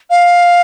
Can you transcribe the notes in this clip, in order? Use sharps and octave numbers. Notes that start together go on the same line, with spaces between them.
F5